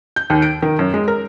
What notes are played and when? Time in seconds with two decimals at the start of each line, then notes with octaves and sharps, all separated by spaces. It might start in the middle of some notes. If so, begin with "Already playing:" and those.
0.16 G6
0.30 D#2
0.42 D7
0.62 D#3
0.79 F#2
0.94 G#3
1.08 A#4